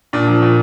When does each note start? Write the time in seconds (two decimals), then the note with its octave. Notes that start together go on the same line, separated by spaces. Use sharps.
0.13 A#2 D4
0.28 F3
0.42 A#2